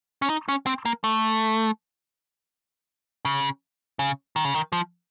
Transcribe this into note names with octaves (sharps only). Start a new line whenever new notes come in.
C#4
D#4
C#4
C4
A#3
A3
C#3
C#3
D#3
C#3
D#3
F3